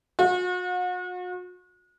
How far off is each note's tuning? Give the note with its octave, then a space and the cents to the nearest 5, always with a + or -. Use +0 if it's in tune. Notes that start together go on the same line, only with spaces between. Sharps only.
F#4 -40